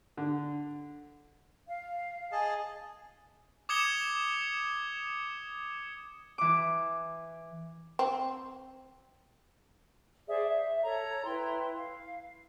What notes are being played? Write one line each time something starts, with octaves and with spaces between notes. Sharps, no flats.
D3
F5
G#4 D#5 A5
D6 D#6 G#6 C#7 E7 G7
E3 D6
C4
G#4 C5 D5 E5
E5
A4 C#5 A#5
E4 B4 G5 C6
F5